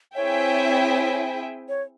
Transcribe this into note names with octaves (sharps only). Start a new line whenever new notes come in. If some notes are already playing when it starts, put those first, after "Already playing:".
C4 E4 G#4 C#5 E5 G5
C#5